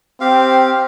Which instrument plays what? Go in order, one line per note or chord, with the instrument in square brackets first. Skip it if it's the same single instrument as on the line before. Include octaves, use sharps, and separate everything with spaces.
[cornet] C4 [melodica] G4 F5